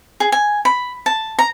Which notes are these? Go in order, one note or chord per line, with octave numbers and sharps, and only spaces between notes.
G#4
G#5
B5
A5
A#5